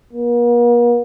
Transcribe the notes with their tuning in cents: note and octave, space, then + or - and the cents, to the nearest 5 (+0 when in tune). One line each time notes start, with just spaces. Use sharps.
A#3 +45